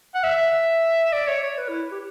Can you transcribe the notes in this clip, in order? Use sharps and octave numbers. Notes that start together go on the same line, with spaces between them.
F#5
E5
D5
C#5
C#5
B4
E4
G4